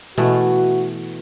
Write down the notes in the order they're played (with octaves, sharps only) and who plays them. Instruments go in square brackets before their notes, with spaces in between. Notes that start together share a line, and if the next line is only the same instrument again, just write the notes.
[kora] B2 E3 A3 [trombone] F#4